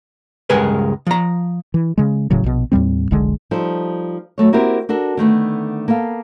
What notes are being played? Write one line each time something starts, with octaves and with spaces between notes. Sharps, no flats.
C#2 G2 G#3 G#4 A#4 B4
F3 A#5
E3
C#3 G#3
D1 A2 C#3 F#3
A#1 B2
D#2 A2 G3 C4
F1 B1 D3 G#3
F3 G3 D#4 A4
F#3 A3 C#5
A#3 C4 E4 F#4 G4 A#4
D4 F#4 A4 A#4
D3 D#3 A3 B3
A#3 B3 A4 F5